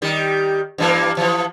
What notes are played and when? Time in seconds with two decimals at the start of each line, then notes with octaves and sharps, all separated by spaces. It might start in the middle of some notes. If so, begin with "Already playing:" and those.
0.02 D#3 G3
0.78 G2 E3 A#3
1.17 E3 F3